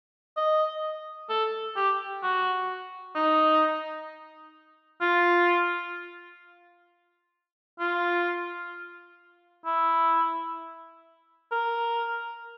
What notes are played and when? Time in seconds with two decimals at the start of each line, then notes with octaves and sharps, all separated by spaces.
0.37 D#5
1.30 A4
1.76 G4
2.23 F#4
3.16 D#4
5.01 F4
7.80 F4
9.66 E4
11.52 A#4